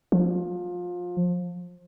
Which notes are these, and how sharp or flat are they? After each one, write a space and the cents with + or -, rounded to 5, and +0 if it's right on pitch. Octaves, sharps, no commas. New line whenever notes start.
F3 +25